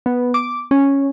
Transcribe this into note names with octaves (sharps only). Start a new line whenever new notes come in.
B3
D6
C#4